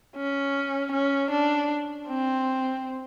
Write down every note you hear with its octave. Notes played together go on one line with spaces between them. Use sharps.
C#4
C#4
D4
C4